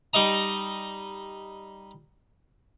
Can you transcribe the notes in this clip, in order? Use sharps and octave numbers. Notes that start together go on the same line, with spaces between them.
G3 D#4 D#5 A#5